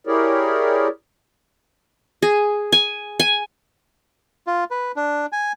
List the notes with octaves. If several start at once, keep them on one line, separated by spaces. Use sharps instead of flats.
E4 G4 G#4 A#4 C#5 D5
G#4
G#5
G#5
F4
B4
D4
G#5